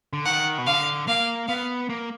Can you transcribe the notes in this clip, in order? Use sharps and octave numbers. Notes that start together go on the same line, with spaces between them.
D3
D#3 F#5
B2
D3 F5
A#3 F5
B3 F5
A#3